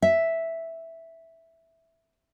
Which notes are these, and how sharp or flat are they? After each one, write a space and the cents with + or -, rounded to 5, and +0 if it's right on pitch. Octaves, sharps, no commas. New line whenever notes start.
E5 -5